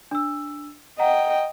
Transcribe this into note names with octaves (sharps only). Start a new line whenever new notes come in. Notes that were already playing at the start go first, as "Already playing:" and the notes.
D4 E6
D#5 F#5 G5 A#5